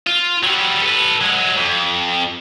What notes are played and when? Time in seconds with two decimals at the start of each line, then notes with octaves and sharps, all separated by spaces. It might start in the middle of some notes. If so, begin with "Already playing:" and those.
0.07 F4
0.43 F#3 G3
0.82 A4 B4
1.21 F#3 G#3
1.57 F2